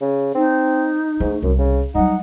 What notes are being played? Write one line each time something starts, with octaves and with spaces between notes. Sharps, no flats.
C#3
C4 D#4
G#2 A3
C2 F#2
C#3
F#3 G3 D#4 F#5